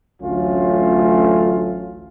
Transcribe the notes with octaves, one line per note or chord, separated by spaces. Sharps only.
A1 D2 F#3 A3 C#4 F4